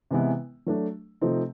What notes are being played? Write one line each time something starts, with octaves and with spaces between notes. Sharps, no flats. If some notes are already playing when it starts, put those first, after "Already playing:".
C3 E3 G#3 B3 E4
F#3 A3 D4
C3 F3 A3 C4 D#4